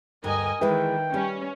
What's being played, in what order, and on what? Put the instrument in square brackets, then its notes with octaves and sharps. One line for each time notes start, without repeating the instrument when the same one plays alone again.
[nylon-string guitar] D2 G2 [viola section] A#4 D#5 G#5
[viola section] D#3 [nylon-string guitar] E3 G#3 [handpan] B4 E5 [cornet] G5
[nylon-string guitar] G3 [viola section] C#4